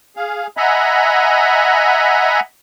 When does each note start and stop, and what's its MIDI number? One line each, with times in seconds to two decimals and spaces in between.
0.16 0.47 68
0.16 0.47 77
0.57 2.40 75
0.57 2.40 76
0.57 2.40 78
0.57 2.40 80
0.57 2.40 82
0.57 2.40 83